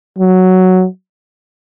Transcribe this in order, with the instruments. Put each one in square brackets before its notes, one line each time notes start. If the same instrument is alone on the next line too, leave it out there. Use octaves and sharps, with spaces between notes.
[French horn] F#3